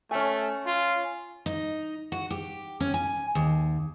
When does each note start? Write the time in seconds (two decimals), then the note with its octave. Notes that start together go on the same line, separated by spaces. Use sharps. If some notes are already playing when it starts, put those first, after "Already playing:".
0.11 A3 C#4 G#5
0.66 F4
1.46 D#4
2.12 F#4
2.31 G4
2.80 C#4
2.94 G#5
3.35 D#2